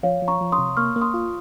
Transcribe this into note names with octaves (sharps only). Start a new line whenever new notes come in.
F3 C#5 F5
F3
A#5 C#6
F3
C6 D#6
C3
A#3 C#6 F6
A#3
C6 D#6
F4